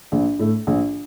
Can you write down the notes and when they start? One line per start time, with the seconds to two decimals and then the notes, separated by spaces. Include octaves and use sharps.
0.12 A#1
0.39 A2 A3
0.67 A#1